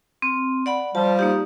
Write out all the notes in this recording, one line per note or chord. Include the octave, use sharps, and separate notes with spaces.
C4
D5 F#5 B5
F3 G3 A5
A#3 D#4 G4